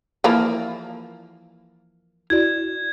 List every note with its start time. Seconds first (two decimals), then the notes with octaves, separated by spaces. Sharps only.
0.24 E3 F3 A#3
2.30 E4 F#4 D5 G#6